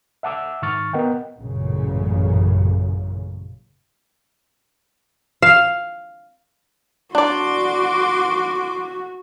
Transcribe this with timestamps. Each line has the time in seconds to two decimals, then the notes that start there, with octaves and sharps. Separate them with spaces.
0.23 E5 F#5 A5 D6 E6
0.62 G#2 D#3 C#6 F6 A6
0.93 B3 A#4 D#5 F#5 G5
1.38 A1 F#2 A#2 C#3
5.42 F5
7.15 D4 F#4 D5 C6 D6